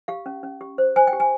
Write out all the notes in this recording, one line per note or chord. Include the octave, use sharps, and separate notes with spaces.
G4 F5
C#4
C#4
G4
C5
C5 G#5
G5
G4
G#5